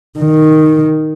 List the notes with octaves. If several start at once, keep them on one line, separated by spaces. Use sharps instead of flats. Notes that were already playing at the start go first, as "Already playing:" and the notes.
D#3